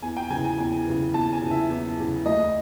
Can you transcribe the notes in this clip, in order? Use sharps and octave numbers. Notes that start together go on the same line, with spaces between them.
E2 G#5
G5
C#3 E3 G#5
G#5
E2 G#5
C#3 E3
E2 A5
G#5
C#3 E3
E5
E2
C#3 E3
D2 D#5